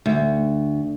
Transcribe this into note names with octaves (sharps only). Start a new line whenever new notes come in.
D2